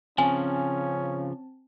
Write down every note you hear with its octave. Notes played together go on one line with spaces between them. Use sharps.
C#3 F3 C4 C#4 G#5 A5